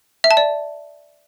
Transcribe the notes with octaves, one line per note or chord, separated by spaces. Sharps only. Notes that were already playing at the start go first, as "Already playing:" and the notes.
E5
A5
D5